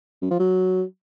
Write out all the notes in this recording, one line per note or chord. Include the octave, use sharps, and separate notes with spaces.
F#2
F3
F#3